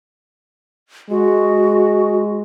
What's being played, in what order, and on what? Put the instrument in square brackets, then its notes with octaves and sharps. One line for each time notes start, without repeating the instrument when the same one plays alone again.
[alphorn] G#3 [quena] F#4